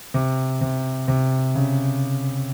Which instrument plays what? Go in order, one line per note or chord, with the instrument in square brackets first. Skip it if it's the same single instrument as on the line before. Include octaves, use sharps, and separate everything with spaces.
[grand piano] C3
C3
C3
C#3